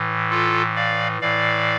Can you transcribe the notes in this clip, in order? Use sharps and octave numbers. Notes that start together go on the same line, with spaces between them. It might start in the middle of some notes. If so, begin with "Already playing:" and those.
Already playing: A2 E3
F4 A4
D5 F5
A2 E3 D5 F5